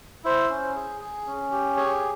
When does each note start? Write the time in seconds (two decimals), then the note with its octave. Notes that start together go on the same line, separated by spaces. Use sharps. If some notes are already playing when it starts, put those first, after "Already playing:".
0.25 E4 C5
0.50 C#4
0.76 G#4
1.01 G#4
1.27 C#4
1.52 G4
1.77 G#4 C#5